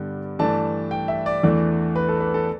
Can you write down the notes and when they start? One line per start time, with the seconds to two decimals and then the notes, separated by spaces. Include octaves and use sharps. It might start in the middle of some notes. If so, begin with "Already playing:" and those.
Already playing: G2 D3 G3 B3 D4
0.39 G2 E3 A3 D4 A5
0.91 G5
1.08 E5
1.26 D5
1.43 E2 E3 A3 D4
1.96 B4
2.09 A4
2.20 B4
2.34 A4